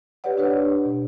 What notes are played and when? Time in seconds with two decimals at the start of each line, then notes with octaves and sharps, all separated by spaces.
0.24 G4 B4 C#5 D5 F#5
0.38 D4 G4 B4 C#5
0.86 B2